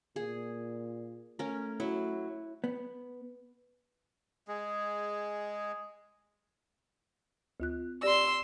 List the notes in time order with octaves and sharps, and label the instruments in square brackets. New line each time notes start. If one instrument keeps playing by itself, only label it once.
[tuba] A#2 [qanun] G#4
[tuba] A3 [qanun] C#4 A#4
[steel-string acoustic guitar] F#3 [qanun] E4
[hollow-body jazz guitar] B3
[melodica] G#3 G#4
[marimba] D2 F4 F#6
[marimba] G4 D5 A#6 [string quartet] C6 E6